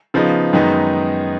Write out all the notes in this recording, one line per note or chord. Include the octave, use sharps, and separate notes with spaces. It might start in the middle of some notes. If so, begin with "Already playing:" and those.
C#3 F3 B3 D#4
F#2 D#3 G#3 B3 D#4